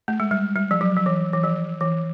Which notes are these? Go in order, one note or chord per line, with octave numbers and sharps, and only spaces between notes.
A3
G#3
G3
G3
F3
F#3
F3
E3
E3
F3
E3